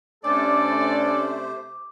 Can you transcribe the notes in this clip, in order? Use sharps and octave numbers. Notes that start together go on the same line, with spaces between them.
C3 A3 C#4 D4 A4 C5 D5 D6